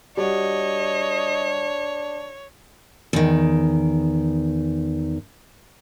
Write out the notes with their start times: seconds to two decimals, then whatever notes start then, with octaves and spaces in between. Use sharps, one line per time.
0.17 G3 D4 F#4 C#5 D#5
3.13 E2 D#3